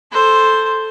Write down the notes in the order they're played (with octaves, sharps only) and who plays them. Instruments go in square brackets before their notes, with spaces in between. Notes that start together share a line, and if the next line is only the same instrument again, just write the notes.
[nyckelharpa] A4 C5